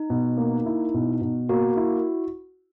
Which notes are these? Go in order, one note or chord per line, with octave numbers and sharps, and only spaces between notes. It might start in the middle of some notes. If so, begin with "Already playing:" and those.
Already playing: D#4
B2
A#3
E4
B2
B2
A#3 F#4
E4